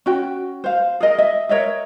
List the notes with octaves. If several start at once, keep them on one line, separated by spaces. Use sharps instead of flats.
C#4 F#4 G5
C5 F5
G#4 A#4 D#5
D#5 E5
A#4 C#5 D#5 E5